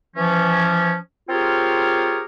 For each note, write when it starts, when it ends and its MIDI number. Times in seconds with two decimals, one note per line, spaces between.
0.16 0.95 52
0.16 0.95 53
0.16 0.95 61
1.29 2.23 60
1.29 2.23 65
1.29 2.23 67
1.29 2.23 68
1.29 2.23 70
1.29 2.23 73